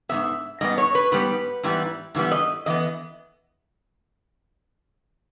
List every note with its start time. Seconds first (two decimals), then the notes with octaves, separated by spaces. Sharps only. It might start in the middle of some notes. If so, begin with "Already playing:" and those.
0.09 G#2 G3 B3 E5
0.61 G#2 G3 B3 D#5
0.78 C#5
0.95 B4
1.12 G#2 G3 B3 B4
1.63 G#2 E3 G3 B3
2.15 G#2 E3 G3 B3
2.32 D#5
2.66 E3 B3 D#5